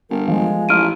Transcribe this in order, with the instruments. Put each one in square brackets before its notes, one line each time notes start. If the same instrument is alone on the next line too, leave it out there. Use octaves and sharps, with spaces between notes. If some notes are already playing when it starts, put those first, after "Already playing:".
[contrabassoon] G1 [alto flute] A#4
[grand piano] F3 [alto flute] G#3
[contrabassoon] A1 [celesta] F6 D7 D#7